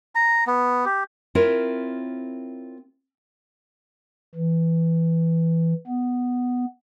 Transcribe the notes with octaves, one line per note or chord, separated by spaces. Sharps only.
A#5
B3
G4
C4 E4 F4 A#4 C#5
E3
B3